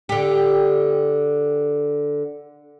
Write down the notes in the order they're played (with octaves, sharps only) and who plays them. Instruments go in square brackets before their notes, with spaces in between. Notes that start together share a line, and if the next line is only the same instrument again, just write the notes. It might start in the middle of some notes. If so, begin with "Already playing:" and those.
[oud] D3 G4